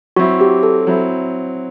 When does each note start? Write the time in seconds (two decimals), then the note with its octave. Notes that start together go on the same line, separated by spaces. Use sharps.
0.16 F#3 C4 E4 F#4
0.41 G4
0.63 A4
0.87 F#3 C4 E4